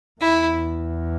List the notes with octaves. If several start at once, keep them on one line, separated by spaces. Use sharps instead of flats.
E2 E4